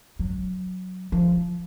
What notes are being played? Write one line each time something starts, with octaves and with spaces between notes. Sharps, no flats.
F#3
F3